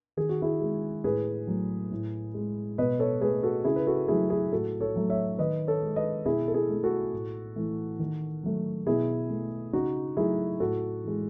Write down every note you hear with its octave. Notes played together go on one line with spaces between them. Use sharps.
D#3 G#4
F#4
E4 G#4
G#3
A2 G#4 B4
F#3 A3
A2
G#3
B2 B4 D#5
A4 C#5
A3 G#4 B4
F#4 A4
C#3 E4 G#4
B4
F#4 A4
F#3 A3 E4 G#4
E4 G#4
A2 F#4 A4
A4 C#5
F#3 A3
C#5 E5
D#3 B4 D#5
A4 C#5
G#3
B4 D#5
B2 E4 G#4
A4
E4 G#4
A3
F#4 A4
A2
E3 A3
D#3
F#3 A3
B2 E4 G#4
A3
C#3 D#4 F#4
F#3 A3 E4 G#4
A2 F#4 A4
E3 G#3